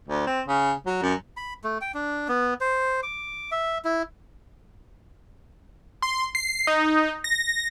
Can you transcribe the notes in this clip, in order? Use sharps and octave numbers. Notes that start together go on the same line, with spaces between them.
D2
C4
C#3
F#3
F#2
B5
A3
G5
D4
B3
C5
D6
E5
E4
C6
C7
D#4
A#6